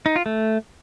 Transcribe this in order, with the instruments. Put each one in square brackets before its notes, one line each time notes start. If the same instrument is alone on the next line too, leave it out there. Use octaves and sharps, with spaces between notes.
[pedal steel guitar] D#4
F4
A3